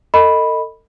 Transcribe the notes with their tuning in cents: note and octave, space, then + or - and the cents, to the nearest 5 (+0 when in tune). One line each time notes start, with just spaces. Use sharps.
A4 +35 D#5 +0 B5 -5